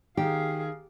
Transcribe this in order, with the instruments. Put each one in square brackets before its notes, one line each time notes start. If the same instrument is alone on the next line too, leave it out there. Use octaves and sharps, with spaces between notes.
[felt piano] D#3 [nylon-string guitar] G4 [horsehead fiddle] G#4 F5